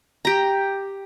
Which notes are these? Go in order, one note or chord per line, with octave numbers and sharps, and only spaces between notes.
G4 A#5